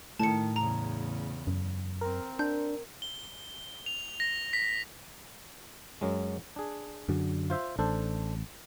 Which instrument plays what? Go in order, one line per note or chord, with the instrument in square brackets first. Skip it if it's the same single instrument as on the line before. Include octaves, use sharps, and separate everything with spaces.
[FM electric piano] A2 [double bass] D#3 [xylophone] A5 C#7
[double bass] E2 C#3 [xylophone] A#5
[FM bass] F#2
[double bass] C4 [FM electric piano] A#4
[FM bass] D4 [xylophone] G6
[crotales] G7
F7
A#6
B6
[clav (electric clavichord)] F#2 F#3 G#3
D4 G#4
[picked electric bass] F#2 D3 F#3
[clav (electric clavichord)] F4 C5 E5
[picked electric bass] A1 [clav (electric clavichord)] D4 A4 C5